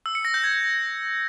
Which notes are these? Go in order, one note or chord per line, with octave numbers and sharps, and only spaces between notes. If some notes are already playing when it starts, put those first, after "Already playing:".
E6
C#7
A#6
G6
G#6